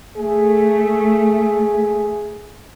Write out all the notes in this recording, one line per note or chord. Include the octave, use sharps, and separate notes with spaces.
A3 G#4